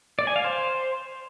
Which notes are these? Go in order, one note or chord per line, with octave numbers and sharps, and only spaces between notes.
D5
G#5
F5
C5